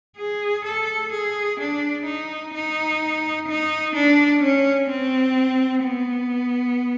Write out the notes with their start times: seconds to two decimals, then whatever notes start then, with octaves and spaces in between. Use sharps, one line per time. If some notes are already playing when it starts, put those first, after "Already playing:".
0.17 G#4
0.65 A4
1.12 G#4
1.60 D4
2.06 D#4
2.54 D#4
3.48 D#4
3.95 D4
4.43 C#4
4.90 C4
5.85 B3